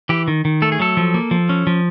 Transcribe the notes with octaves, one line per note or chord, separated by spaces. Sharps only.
E3 G4
D#3
D#3
A3 A4
G#4
F#3 A4
F3
A#3
F3
C#4
F3